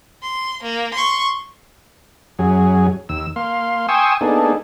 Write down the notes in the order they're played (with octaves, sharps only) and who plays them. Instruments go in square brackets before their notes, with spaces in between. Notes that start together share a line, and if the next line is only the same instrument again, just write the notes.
[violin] C6
A#3
C6 C#6
[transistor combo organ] F#2 F#3 G#4
D#2 E6
A#3 F5 C6
G5 G#5 C6 C#6 D#6 E6
A#3 B3 D4 D#4 G#4 A4